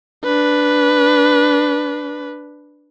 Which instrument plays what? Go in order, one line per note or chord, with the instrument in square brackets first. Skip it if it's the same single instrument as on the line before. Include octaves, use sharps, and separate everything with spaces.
[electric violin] D4 B4